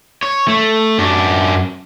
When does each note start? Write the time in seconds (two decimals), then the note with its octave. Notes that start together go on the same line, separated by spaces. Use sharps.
0.23 C#5
0.48 A3
0.98 F#2 D4